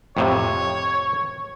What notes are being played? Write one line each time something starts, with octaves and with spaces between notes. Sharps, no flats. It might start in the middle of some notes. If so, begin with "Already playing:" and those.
F2 A2 C3 C#5